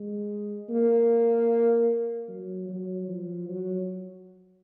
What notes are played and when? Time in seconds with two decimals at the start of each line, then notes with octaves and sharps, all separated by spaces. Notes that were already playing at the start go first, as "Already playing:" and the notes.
Already playing: G#3
0.69 A#3
2.29 F#3
2.69 F#3
3.08 F3
3.49 F#3